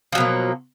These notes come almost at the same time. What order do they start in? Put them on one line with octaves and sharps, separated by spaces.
F3 F#3 B2 A#3